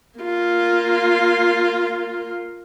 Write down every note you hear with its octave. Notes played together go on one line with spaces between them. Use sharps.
A#3 F4